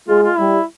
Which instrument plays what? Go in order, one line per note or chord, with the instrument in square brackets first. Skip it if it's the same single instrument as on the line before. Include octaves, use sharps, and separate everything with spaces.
[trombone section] G#3 [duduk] F4
[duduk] F4
[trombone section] G3 [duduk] E4